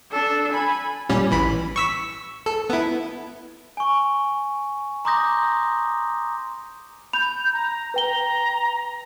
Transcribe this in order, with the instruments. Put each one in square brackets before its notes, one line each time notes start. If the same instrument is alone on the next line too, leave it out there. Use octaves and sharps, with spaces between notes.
[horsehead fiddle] D4 A4
G#5 B5
[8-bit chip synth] A#2 G3 C#4
A1 E3 B5
C#6 E6 B6
A4
B3 E4
[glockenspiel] G#5 C#6
A#5 C6 D6 D#6 G6 A#6
[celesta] B5 F7 [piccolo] G6
[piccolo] A#5
[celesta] B4 G5 G7 [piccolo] A#5